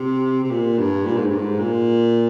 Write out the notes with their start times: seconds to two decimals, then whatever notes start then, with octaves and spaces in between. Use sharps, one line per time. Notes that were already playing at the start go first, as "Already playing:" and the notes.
Already playing: C3
0.44 C3
0.50 A#2
0.78 G2
1.05 A#2
1.17 G#2
1.27 G2
1.38 G#2
1.60 A#2